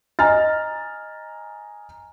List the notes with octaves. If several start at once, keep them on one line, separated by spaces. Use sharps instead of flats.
D#5 G#5 A#5 F6 A6